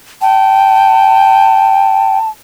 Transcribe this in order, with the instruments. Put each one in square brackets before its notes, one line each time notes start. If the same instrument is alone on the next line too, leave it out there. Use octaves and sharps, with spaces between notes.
[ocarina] G5 [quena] A5